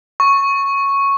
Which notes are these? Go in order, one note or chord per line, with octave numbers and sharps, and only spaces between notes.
C#6